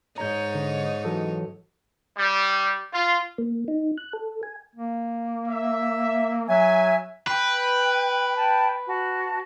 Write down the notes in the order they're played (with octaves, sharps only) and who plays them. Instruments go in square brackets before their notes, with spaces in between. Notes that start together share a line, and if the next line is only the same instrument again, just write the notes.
[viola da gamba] G#2 D#4 C#5 [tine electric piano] A#5 G6
[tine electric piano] D3
E3 F#3 A4
[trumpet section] G3
F4
[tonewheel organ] A#3
D#4
F#6
A4
G#5
[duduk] A#3
[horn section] E5
[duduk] F#3 [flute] E5 [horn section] G#5
[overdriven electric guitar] B4 [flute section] G5
[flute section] G5 A5
F#4 A5